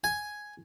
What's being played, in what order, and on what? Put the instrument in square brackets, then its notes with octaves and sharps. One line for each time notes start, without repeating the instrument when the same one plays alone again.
[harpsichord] G#5